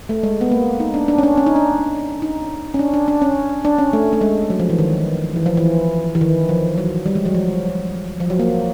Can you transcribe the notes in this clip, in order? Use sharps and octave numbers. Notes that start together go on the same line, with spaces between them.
A3
G#3
B3
A#3
D#4
D4
D4
C#4
D4
C#4
D#4
D4
D#4
C#4
D4
D4
D4
C#4
D4
C#4
A3
A3
G#3
F#3
F3
E3
D#3
E3
F3
E3
E3
D#3
F3
F#3
G3
G#3
F#3
F3
F3
F#3
A#3